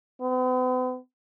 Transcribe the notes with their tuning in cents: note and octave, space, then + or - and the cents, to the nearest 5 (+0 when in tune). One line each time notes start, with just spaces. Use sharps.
B3 +45